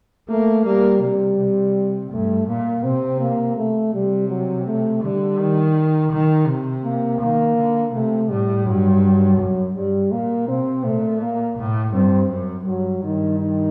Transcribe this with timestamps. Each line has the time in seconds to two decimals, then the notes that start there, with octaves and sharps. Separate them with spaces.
0.29 A3 A#3
0.65 G3 A#3
1.01 C3 G3
1.38 C3
2.11 G2 A3
2.47 A#2 A#3
2.83 C3 C4
3.20 A#3
3.56 A3
3.93 C3 G3
4.29 F#3
4.66 A3
5.02 D3 G3
5.38 D#3
6.11 D#3
6.47 C3
6.84 A#3
7.20 D#3 A#3
7.57 D3
7.93 C3 A3
8.29 A2 G3
8.66 G2 F#3
9.03 F#3
9.38 F#2
9.76 G2 G3
10.12 A#2 A#3
10.48 C3 C4
10.84 A#2 A3
11.21 A#3
11.57 A2
11.93 G2 C4
12.30 F#2
12.66 G2 F#3
13.03 G2 D#3
13.39 D#3